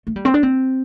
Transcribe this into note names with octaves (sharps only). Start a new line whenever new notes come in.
A3
G3
C4
D4
C4